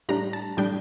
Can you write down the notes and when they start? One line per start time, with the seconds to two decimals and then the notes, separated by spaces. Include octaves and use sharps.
0.09 A2 G3 D4 A#5
0.33 A5
0.57 A2 G3 D4 G5